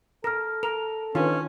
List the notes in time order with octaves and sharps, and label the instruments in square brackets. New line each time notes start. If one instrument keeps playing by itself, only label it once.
[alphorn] A4 [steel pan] A#4 [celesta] F6 A#6
[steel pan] A#4 [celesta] F7
[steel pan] D#3 F4 [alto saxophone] C#4 [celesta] D4 B4